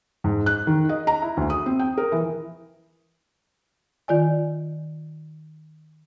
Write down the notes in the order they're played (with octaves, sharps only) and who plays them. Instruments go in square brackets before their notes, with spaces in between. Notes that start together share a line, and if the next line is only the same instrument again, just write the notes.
[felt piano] G#2
F#6
D#3
D#5
A#5
E4
D2
D#6
C4
G5
A#4
E3
[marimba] D#3 F4 D5 G#5